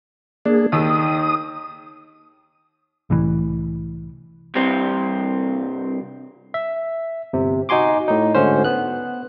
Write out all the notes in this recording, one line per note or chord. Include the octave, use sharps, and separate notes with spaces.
A#3 D4 G#4
D#2 D#3 D#6 E6
C2 A2 E3
C2 G2 C3 G3 C4
E5
G1 C3
D#4 F#4 G#5 C6 D6
A2 D#4
D2 G#2 D3 C#4 C5
B3 F#6